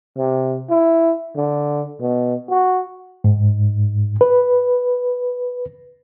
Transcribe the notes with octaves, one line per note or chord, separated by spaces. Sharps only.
C3
E4
D3
B2
F#4
G#2
B4